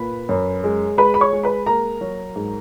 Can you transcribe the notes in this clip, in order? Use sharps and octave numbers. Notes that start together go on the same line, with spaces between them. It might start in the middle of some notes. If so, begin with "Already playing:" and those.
Already playing: A#2 B4 B5
F#2
G#3
G#3 B4 B5
B5
C#5 C#6
G#3
B4 B5
A#3 A#4 A#5
F#3
G#2